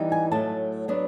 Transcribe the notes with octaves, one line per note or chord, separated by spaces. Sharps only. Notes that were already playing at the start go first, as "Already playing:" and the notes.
Already playing: E3 G3 B3 D#4
G#5
A2 F#3 A3 A5
F#3 B3 D4